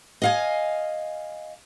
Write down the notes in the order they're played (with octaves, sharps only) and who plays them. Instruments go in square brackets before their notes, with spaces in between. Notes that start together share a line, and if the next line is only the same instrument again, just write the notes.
[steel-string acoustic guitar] D#5 F5 G#5